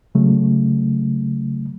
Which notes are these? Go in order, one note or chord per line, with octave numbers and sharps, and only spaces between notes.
C#3 F#3 A3